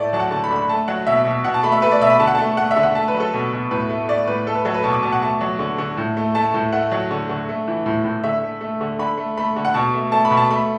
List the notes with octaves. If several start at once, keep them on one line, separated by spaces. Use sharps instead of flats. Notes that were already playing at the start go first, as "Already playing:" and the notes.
Already playing: A2 A3 D5
F#3 A5
F#5
D3 A5
B5
D3
B5
A3 A5
F#3 F#5
B2 E5
B2
B2 F#5
A5
A3 B5
E5
A3 B4
D5
B2 E5
B5
D3 A5
F#5
A3 A5
A3 F#5
E5
D3
F#5
A3 A5
B4
F#3
A4
B2
B2
A2 B4
A3
A3 D5
A2 B4
A3 A4
B4
F#3 A4
B4
B2 A5
D6
B2 A5
F#5
A3 A5
F#3
D3
D3
A2
A3
A3 A5
A2
A3 F#5
F#3
D3
D3
A3
E3
A2
A2
D3 E5
A3
A3
D3
D3 B5
A3
A3 B5
D3
F#5
B2 A5
A3
A3 A5
B5
B2
A5
A3 B5